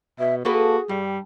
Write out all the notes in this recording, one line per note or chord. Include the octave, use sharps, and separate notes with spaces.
B2 E5
A#3 F#4 G#4 A4 B4
G2 G3